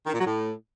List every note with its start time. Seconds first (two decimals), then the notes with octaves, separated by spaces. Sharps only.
0.07 D#3
0.13 A#2
0.20 F#3
0.26 A2